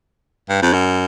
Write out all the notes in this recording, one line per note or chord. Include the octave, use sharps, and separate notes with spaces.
G2
F2
F#2